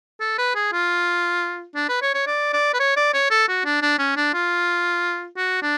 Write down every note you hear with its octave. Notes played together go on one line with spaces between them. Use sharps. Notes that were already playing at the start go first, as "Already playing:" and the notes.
A4
B4
G#4
F4
D4
B4
C#5
C#5
D5
D5
B4
C#5
D5
C#5
A4
F#4
D4
D4
C#4
D4
F4
F#4
D4